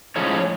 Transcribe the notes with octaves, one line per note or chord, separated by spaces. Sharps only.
A2 F3 G#3 C#4 C#5